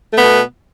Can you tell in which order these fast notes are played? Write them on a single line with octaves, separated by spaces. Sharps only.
A3 B3 B2